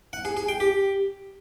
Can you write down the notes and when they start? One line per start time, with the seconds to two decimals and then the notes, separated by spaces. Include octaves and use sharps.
0.13 F#5
0.25 G#4
0.37 G#4
0.48 G5
0.60 G4